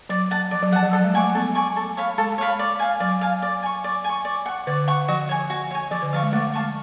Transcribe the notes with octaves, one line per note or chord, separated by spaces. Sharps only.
F#3 D5
F#5 A5
F3 D5
F#3
F3 F#5 A5
F3
F#3 A4
G#3
A3 D5 G#5 C#6
A3
B3 A4
D5 G#5 C#6
A4
C#5 F5 B5
G#3 A4
C#5 F5 B5
D5
F5 G#5
F#3 D5
F5 G#5
D5
G#5 C#6
D5
G#5 C#6
D5
F#5 C#6
D3 D5
F#5 C#6
F3 F#4
C#5 G#5
F#4
C#5 G#5
F3 D5
D3
F3 F5 A5 C#6
G#3
A3 D5
F5 A5 C#6